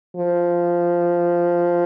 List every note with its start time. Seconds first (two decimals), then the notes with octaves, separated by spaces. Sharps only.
0.16 F3